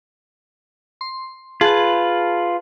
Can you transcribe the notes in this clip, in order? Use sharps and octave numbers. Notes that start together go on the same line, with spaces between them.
C6
F4 G#4 B4 A5 F#7